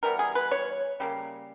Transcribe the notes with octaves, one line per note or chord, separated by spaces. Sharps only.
E3 G3 B3 A#4
G#4
B4
C#5
C#3 G3 A#3